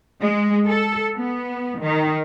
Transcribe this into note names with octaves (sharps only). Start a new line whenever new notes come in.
G#3
A4
B3
D#3